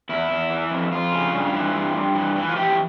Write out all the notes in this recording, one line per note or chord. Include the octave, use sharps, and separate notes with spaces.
E2 E4
E2
E3
F2
F2 F4
C#3
G2
E3
G2
G2
E3
E3
F4
E3 G4